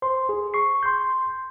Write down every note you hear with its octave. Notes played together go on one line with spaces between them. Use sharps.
C5 C6
G#4
C#6 C7
C6 G6